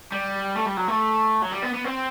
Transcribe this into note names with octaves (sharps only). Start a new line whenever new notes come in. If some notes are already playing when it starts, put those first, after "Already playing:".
G3
A3
G3
F#3
A3
F#3
G3
B3
B3
C4